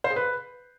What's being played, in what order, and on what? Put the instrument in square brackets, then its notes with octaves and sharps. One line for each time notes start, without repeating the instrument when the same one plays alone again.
[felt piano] C5
G#4
B4